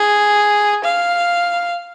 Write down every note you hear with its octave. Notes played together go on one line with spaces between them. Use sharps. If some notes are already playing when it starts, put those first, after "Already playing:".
Already playing: G#4
F5